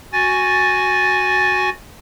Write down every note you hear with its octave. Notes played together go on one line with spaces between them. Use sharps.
F#4 G#5 A6